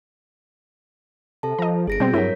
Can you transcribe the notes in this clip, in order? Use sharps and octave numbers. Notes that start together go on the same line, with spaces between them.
C3 A4 A5
F3 D#5 A#5
G1 G#4 A#6 D7
B2 G3 C4 G6
G2 F#3 E4 A#4 C#5 B6